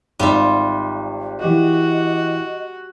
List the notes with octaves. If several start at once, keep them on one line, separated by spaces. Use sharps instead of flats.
G#1 G3 F4 E5
E3 F#4 G4 D#5